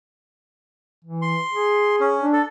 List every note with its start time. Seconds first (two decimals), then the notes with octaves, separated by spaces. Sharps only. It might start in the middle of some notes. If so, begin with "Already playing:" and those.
1.05 E3
1.22 C6
1.54 G#4
2.00 C#4
2.19 D4
2.33 A4